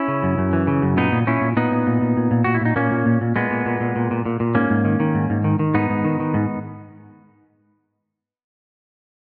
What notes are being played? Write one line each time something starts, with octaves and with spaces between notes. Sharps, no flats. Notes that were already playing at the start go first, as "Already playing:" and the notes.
Already playing: C#4 E4
C#3
F#2
F#2
E3
C#3
F#2
A#2 B3 D#4
A#2
A#2 C#4 E4
A#2
A#2 B3 D#4
A#2
A#2
A#2
A#2
A#2
A#2 F#4
E4
A#2 D#4
A#2 A#3 C#4
A#2
A#2
A#2
A#2 G#3 B3
A#2
A#2
A#2
A#2
A#2
A#2
A#2
G#2 A#3 C#4
G#2
D#3
D#3
G#2
G#2
D#3
D#3
G#2 B3 D#4
G#2
D#3
D#3
G#2